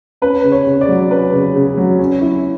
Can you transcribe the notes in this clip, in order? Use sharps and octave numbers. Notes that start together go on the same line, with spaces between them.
C#4 B4
C#3
C#5
C#3
D5
F#3
C#4 B4
C#3
C#3
F#3
C#4
E4